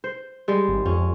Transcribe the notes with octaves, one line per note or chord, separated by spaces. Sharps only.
C5
G3 G#3
G#1
F2 C#4